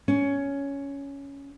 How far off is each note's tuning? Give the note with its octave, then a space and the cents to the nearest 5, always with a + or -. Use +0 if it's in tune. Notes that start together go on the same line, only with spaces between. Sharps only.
C#4 +10